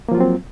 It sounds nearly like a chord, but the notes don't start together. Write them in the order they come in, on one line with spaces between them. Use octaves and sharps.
A#3 F3 F4 F#3 C4